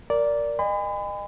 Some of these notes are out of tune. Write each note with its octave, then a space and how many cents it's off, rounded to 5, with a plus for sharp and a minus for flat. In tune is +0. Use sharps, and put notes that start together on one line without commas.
A#4 +0 D5 -10
D#5 -35 G#5 -40 B5 +35